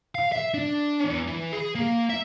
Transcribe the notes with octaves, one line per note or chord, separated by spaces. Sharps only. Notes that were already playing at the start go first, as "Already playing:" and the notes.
F5
E5
D4
E2
E3
G#4
A#3
E5